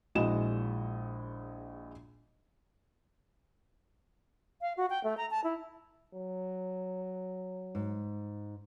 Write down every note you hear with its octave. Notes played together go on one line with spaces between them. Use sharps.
A#1 G#3 E4 F#4 D#5 E7
F5
F#4
G5
A3
A#5
A5
E4
F#3
G#2